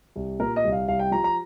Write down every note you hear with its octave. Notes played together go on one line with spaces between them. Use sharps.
C2
A#2 A#4
D#5
C2
F5
C2 F5
G5
F3 A#5
A#5